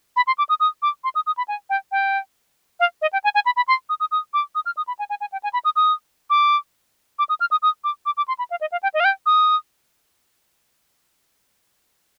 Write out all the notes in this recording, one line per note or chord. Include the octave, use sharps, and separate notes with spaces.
B5
C6
D6
D#6
D#6
D6
C6
D#6
D#6
B5
G#5
G5
G5
F5
D#5
G5
G#5
G#5
B5
B5
C6
D#6
D#6
D#6
D6
D#6
F6
D#6
B5
G#5
G#5
G#5
G5
G#5
B5
D#6
D#6
D6
D6
D#6
F6
D#6
D#6
D6
D6
D6
C6
B5
F5
D#5
F5
G5
D#5
F5
G5
D#6